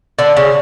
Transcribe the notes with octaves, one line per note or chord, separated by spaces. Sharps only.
D3
C#3